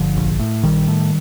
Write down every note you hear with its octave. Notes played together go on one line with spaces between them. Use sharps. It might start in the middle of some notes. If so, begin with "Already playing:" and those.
Already playing: G1 D3 F3
A#1
A2
A#1 D#3 G3
A2